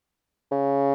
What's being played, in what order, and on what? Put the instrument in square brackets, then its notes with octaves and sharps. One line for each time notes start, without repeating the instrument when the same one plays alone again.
[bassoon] C#3